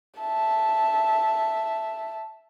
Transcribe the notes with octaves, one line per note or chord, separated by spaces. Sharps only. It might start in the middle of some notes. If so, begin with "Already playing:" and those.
E5 A5